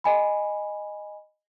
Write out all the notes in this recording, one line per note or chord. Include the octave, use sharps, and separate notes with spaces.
D#5 G#5 B5